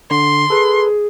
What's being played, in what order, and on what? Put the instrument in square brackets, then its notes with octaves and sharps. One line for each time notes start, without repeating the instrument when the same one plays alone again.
[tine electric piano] D3 [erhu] C6
[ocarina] G#4 [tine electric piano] A4 B4